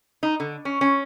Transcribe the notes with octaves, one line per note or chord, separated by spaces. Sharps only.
D#4
D3
C#4
C#4